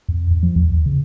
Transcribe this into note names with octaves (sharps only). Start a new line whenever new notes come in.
F2
F2
F3
E2
D#2
C#3